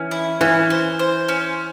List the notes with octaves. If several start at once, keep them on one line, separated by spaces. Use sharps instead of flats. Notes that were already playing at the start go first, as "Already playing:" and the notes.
Already playing: E3 C#4
E4
E3 C#4
C5
C5
C#4